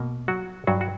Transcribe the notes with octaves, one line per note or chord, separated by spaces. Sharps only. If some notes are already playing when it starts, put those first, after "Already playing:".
Already playing: B2 A#3
F#3 F#4
G2 F#3 F#4
F#4